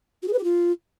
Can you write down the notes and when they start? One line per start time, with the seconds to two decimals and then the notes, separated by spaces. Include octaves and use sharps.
0.22 F#4
0.27 G#4
0.33 B4
0.38 G4
0.43 F4